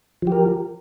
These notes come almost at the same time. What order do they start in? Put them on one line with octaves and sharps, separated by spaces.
F3 G4 A#4